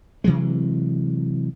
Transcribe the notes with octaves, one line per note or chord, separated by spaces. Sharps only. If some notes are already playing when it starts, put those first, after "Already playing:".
C3 E3 F#3 G#3